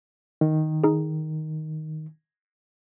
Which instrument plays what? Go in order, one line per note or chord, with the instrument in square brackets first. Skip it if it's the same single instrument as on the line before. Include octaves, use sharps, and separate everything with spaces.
[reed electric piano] D#3
[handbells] D#4 G#4